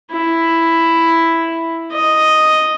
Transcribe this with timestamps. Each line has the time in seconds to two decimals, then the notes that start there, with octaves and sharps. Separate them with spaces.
0.12 E4
1.92 D#5